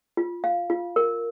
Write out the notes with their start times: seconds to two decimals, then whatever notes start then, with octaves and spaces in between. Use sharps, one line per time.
0.17 F4
0.44 F5
0.70 F4
0.96 A#4